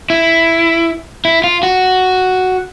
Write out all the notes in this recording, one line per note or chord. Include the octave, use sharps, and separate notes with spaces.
E4
E4
F4
F#4